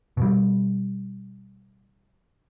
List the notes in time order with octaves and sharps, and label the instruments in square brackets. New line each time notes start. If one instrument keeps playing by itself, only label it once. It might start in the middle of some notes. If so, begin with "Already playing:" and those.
[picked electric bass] B2 G3